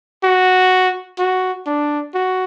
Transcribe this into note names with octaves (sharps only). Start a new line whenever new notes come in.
F#4
F#4
D4
F#4